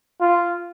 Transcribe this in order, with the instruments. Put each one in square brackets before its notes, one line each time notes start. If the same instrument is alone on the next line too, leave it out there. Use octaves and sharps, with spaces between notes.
[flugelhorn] F4